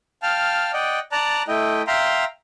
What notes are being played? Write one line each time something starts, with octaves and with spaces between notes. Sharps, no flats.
F5 G5 A5 F6
D5 D#5 F#5 G5
D5 A5 A#5 F#6
A3 E4 D#5 G5
E5 F5 G5 A#5 C6